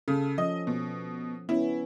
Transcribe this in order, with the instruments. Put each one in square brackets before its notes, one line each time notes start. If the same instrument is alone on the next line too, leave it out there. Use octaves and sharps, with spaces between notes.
[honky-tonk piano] C#3 [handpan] A4
[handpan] F3 C#4 [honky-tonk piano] D#5
[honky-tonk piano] B2
[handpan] B3 C#4 [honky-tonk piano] E4